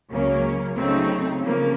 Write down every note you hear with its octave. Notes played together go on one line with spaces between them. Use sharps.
C#2 C#3 F#3 A#3 C#4
C#3 F#3 A3 C4 D#4
C#3 F3 A#3